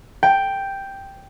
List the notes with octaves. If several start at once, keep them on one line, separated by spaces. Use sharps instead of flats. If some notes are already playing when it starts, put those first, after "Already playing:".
G5